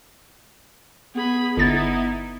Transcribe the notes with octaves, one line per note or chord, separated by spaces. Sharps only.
B3 G#4 B5
G1 D#4 E4 A6